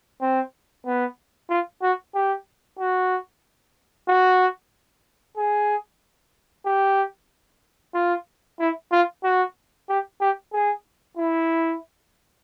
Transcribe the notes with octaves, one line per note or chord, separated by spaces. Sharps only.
C4
B3
F4
F#4
G4
F#4
F#4
G#4
G4
F4
E4
F4
F#4
G4
G4
G#4
E4